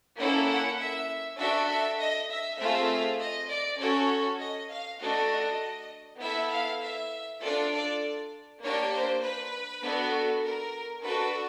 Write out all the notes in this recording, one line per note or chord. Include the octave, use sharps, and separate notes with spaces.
A#3 C#4 E4 A4 F#5
F#5
E5
D4 F#4 A4 E5
E5
D#5
E5
A3 C4 F4 G#4 E5
D#5
D5
C#4 F#4 A4 C#5
D#5
F5
A3 D4 F#4 A4 D#5
B3 E4 A4 E5
F5
E5
D4 F4 A4 D5
D5
A#3 D4 G4 C#5
C5
B4
B3 D4 F#4 A4
A#4
D4 F#4 A4 B4